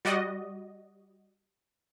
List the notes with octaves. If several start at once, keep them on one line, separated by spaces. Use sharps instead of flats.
G3 F#4 D5 D#5